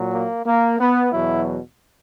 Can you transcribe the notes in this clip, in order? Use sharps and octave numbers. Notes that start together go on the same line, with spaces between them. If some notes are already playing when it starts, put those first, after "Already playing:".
Already playing: A#2 F#3
A#3
A#3
B3
E2 B2 F#3 E4